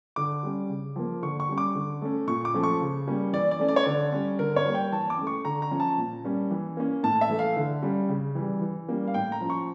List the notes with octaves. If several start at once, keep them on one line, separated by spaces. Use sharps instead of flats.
D3 D6
G3 C#4
C#3
F3 A#3
D3 C#6
C#6
G3 C#4
D6
D3
A3 C#4
A#2 C#6
D6
F3 A3 C#4
C#6
C#3
G3 A#3 C#4
E3 D5
D5
A3 C#4
D5
C#5
D3 D5
G3 C#4
D3 A#4
C#5
G3 A#3
G5
E3 A5
D6
A3 C#4
C#6
D3 A#5
A#5
F3 C#4
A5
A#2
G3 A#3 C#4
E3
A#3 C#4
A2 A5
E5
E3 A3
F5
D3
G3 C#4
C#3
E3 G3
E3
G3 A#3 C#4
F5
A2 G5
A#5
F3 C#4
C#6